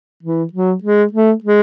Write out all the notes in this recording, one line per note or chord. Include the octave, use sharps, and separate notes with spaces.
E3
F#3
G#3
A3
G#3